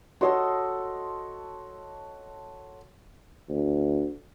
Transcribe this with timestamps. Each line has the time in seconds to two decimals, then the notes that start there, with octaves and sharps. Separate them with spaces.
0.21 F#4 A4 C#5 D#5 C6
3.50 D2